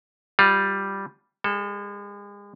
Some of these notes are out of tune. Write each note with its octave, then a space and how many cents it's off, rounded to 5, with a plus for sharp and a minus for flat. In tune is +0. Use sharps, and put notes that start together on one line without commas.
G3 +0 F4 +20
G#3 -40 A4 +0